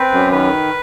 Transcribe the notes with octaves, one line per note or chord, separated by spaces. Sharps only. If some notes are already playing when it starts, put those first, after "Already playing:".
Already playing: C4 B4
F#2
D#3 B4